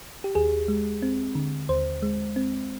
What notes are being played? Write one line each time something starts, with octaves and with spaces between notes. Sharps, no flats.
G4
D#2 G#4
G#3
C4
D3
D#2 C5
G#3
C4